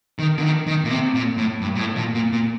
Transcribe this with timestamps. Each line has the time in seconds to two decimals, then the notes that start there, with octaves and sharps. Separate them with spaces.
0.19 D#3
0.38 D3
0.43 D#3
0.67 D#3
0.84 A#2
0.91 C3
1.15 A#2
1.37 A2
1.61 G2
1.76 A#2
1.79 A2
1.97 A#2
2.14 A#2
2.32 A#2